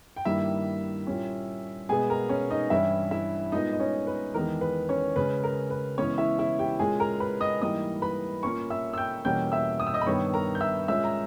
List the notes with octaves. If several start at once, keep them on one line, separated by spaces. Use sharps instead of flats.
G5
G2 D#3 G3 A#3 E4 E5
A#2 G3 C#4
B2 G#3 B3 G#4 G#5
A#4 A#5
C#4 C#5
D#4 D#5
G2 E3 G3 C#4 E4 E5
E4 E5
A#2 G#3 B3 D#4 D#5
D#5
C#4 C#5
B4
E2 D#3 G#3 B3 A#4
B4
C#4 C#5
C#3 G#3 C#4 B4
A#4
B4
C#3 E3 G#3 B3 C#4 C#5
E4 E5
E4 E5
G4 G5
A#2 G#3 C#4 G#4 G#5
A#4 A#5
B4 B5
D#5 D#6
G#2 E3 G3 A#3 D#5 D#6
B4 B5
A#2 A#3 C#4 C#5 C#6
E5 E6
E6
G5 G6
E2 B2 G3 A#3 C#4 G5 G6
E5 E6
D#6
E6
D#5 D#6
B5
G2 D#3 G3 B3 C#5 C#6
A#4 A#5
G6
E5 E6
A#2 G#3 C#4 E5 E6
A#5